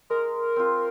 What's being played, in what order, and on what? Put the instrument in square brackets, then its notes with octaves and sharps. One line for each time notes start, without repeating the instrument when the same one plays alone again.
[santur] G#3 [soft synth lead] A#4
[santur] C4 F4